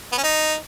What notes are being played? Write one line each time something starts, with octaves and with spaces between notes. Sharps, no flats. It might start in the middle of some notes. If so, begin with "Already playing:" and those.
B3
C#4
D#4